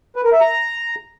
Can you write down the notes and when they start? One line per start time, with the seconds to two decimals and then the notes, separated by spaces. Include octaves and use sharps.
0.16 B4
0.24 A#4
0.32 E5
0.41 A#5